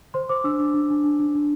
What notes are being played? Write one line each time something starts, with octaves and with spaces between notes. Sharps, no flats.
C5 C6
C5 D6
D4 E6
D4
D4
D4
D4
D4
D4